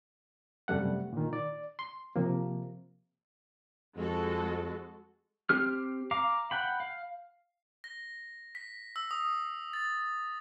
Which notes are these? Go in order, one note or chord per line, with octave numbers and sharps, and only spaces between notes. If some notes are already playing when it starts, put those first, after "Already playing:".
F#2 C3 G3 A3 F#5
A#2 D#3
D5
C6
C3 F3 A#3
F2 G#3 F#4 A4
C4 G4 F6
F5 A#5 D6
F#5 G5 B5
F5
A#6
B6
E6
D#6
A6